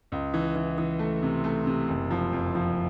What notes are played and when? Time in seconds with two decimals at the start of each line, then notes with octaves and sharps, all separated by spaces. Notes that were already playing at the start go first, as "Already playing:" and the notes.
0.12 C#2
0.34 E3
0.55 E3
0.78 E3
0.99 A3
1.23 C3
1.44 A3
1.67 C3
1.88 F#1
2.10 F3
2.33 F2
2.55 F3